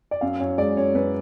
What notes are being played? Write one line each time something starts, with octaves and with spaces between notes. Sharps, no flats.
D5
F#2 F5
F#2 C#5
G#3 D5
F#2 C#5
F#2 B4